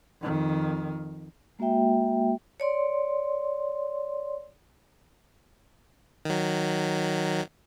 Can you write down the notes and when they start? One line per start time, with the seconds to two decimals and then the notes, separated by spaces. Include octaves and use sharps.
0.21 F2 D#3
1.59 G#3 A#3 F#4 E5 G5
2.60 C#5 D5 C6
6.25 D#3 F#3